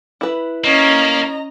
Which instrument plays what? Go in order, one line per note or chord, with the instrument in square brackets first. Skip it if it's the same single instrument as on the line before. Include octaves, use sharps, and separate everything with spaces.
[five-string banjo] E4 B4
[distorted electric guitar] A#3 [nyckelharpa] C#4 [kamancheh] D#5 A#5